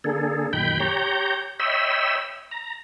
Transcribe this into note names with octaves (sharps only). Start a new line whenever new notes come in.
D3 A#3 G#4 A4
F#2 A#2 D#3 G5 B5 G6
G4 C#5 A#5 G6
C#5 D#5 E5 G5 B5 E6
A#5